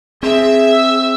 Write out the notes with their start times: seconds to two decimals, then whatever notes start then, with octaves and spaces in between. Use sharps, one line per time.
0.23 C4 G#4 E5
0.72 E6